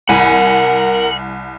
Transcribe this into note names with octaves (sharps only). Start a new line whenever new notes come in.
C2 A#4 F#5 G#5 B5